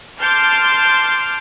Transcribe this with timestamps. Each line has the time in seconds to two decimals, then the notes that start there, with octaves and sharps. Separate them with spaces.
0.21 A5 C6 D6 F6 G6